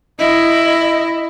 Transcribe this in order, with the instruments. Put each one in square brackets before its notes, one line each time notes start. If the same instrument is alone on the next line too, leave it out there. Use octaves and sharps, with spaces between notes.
[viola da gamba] E4 [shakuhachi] D#5